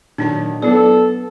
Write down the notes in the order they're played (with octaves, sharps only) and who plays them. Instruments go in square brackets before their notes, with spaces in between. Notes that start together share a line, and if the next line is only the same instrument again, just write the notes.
[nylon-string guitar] A#2 D#3 F#3 [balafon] D4 D#4 A5
[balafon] F#3 E4 D5 [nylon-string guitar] B3 [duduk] A4